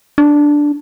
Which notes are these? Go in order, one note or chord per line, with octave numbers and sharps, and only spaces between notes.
D4